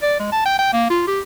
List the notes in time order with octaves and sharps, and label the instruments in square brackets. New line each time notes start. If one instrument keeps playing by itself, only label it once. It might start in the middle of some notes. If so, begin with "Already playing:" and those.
[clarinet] D5
G#3
A5
G5
G5
A#3
F4
G4